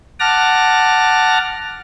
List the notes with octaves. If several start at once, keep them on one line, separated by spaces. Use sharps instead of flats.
F#5 A5 D6 F6 A#6